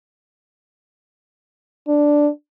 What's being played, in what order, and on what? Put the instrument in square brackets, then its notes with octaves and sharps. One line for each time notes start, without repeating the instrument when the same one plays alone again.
[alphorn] D4